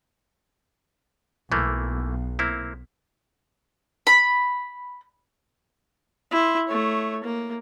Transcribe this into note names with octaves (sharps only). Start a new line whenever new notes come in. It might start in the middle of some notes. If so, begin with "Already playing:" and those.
B1 E3 A3 A#3
A#3 C4 E4
B5
E4 C6
A3 C#5
A#3